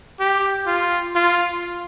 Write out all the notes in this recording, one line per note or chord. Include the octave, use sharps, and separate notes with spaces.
G4
F4
F4